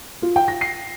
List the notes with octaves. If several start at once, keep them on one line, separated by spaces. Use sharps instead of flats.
F4
G5
A#6
C7